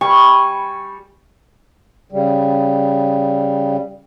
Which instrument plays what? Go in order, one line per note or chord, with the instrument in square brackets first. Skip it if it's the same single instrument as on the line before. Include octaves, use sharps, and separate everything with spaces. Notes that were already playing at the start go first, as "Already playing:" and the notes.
[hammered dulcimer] G3 G#5 C#6
[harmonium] C#3 G3